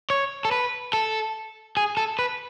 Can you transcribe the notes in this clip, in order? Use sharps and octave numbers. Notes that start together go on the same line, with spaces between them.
C#5
A4
B4
A4
G#4
A4
B4